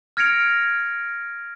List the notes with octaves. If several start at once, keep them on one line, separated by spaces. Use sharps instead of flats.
F6 G#6 A#6 C#7 D7 F7